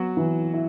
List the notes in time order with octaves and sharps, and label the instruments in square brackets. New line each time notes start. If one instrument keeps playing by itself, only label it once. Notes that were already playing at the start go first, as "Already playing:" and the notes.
Already playing: [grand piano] F#3 F#4 [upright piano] B3
[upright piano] E3
E4